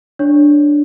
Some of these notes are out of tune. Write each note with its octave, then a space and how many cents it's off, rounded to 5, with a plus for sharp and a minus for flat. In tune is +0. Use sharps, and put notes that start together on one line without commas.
D4 +0 C#5 +0